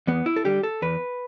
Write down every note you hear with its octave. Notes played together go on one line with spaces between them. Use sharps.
E2 B3
E4
A4
D3 G3 G4
A4
E2 B4